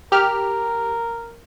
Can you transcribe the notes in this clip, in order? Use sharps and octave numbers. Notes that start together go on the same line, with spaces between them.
G4 A#4 F6